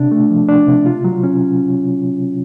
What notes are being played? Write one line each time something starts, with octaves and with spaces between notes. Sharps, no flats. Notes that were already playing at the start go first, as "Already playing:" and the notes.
Already playing: C3 D4
A3
F3
D4
C3
F4
F#3
C#4